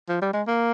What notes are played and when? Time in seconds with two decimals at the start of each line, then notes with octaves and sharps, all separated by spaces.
0.09 F3
0.22 G3
0.33 G#3
0.47 A#3